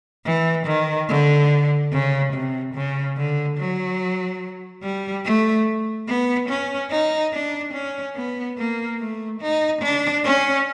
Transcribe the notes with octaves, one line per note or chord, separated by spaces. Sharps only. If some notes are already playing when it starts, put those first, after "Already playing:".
E3
D#3
D3
C#3
C3
C#3
D3
F#3
G3
A3
B3
C#4
D#4
D4
C#4
B3
A#3
A3
D#4
D4
C#4